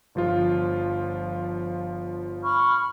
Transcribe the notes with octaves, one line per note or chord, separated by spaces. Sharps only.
G1 F3 F4
B5 C#6 F6